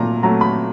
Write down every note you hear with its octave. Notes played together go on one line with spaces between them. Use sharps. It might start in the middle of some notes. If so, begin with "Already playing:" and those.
Already playing: A#2 F#3 A3 A#5
F#3 A3 A#5
B5